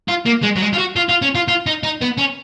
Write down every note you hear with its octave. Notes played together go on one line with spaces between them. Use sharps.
F4
A#3
G#3
F#3
G#3
F4
F#4
F4
F4
C#4
F4
F4
D#4
D#4
B3
C#4